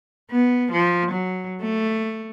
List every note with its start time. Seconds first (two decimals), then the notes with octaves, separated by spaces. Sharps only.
0.31 B3
0.72 F3
1.11 F#3
1.62 A3